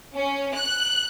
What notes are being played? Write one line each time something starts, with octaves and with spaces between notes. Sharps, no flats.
C#4
F#6